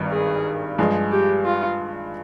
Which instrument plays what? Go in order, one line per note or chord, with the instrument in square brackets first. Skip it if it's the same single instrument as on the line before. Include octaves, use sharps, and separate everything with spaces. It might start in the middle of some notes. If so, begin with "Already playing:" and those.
Already playing: [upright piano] G#1 G2 D#3 G3
[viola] G#4
[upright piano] G2 F3 G#3
[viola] G4
F4